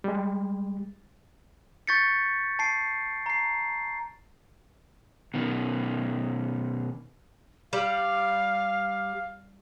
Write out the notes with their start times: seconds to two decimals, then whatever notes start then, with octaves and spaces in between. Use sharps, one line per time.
0.04 G3 G#3
1.87 C#6 G6 A6 B6 C#7
2.59 A5 C7 D7
3.26 A#5 C7
5.34 B2 D#3
7.73 G3 F5